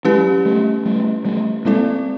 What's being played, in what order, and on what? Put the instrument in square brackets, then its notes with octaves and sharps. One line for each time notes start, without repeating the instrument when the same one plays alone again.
[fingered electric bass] F#3 G#3 [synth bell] C#4 E4 G4 B4
[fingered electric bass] G3 A3
G3 A3
G3 A3
[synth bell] G3 C4 E4 A4 D5 [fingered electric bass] G#3 A#3